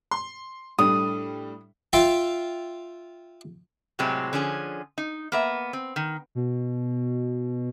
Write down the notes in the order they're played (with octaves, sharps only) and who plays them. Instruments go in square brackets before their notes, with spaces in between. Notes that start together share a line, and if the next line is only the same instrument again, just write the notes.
[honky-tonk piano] C6
[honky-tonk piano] A2 G3 D4 [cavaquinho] D#6
[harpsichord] F4 E5 F5 G5
[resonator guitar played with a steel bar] A2 C3 F#3 G#3 C4
D3 F3 C#4 G#4
D#4
A#3 B3 E5
C4
D#3
[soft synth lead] B2